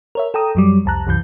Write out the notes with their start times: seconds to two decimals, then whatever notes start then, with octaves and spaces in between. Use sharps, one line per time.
0.15 A#4 C#5 E5
0.34 A4 G5 A#5 D#6
0.55 F#2 F#3 G3
0.85 C2 F2 A5 A#5 F#6
1.07 C2 F#2 E3 G6